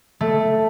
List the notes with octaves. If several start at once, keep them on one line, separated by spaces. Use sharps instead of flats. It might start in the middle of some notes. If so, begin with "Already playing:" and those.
A3